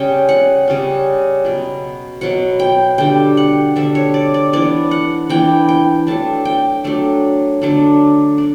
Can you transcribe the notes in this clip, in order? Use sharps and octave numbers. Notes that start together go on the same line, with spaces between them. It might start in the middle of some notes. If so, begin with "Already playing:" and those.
Already playing: C#3 G3 C#4 G5
F#5
C#3 G3 C#4
B2 F#3 B3
B2 F#3 B3 F#5
G5
D3 G3 D4 G5
F#5
D3 G3 D4 E5
C#5
D5
D5
E3 B3 D4 D5
F#5
E3 B3 D4 G5
G5
F#3 A3 D4 A5
G5
F#3 A3 D4
D3 F#3 A3 D4
D4